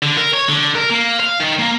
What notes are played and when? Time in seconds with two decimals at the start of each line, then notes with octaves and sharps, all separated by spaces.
0.02 D3
0.17 A#4
0.34 C#5
0.49 D3
0.75 A#4
0.91 A#3
1.20 F5
1.40 D#3
1.58 A#3